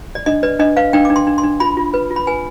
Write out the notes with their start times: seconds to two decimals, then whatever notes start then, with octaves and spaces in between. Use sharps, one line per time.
0.15 D5
0.26 D4 D#5
0.43 B4 D5
0.59 D4 D#5
0.77 B4 F5
0.93 D4 G5
1.05 D4 D6
1.16 C6
1.27 D4
1.38 C6
1.43 D4
1.60 F4 B5
1.77 F4
1.94 B4
2.11 F4
2.16 B5
2.27 B4 G#5